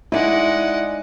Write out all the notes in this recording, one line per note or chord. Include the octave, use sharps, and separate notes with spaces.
G#3 D#4 E4 D5 E5 F#5